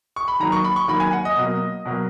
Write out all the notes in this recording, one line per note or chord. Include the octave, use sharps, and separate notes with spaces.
C#6
B5
D#3 F#3 A#3 A#5
C#6
B5
C#6
D#3 F#3 A#3 B5
G#5
F#5
D#5
B2 F#3 A#3
B2 F#3 A#3